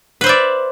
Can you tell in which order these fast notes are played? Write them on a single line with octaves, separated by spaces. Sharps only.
B4 C5 E5 D5